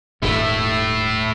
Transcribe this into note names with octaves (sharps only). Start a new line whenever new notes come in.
D#1 G#2 A3 E4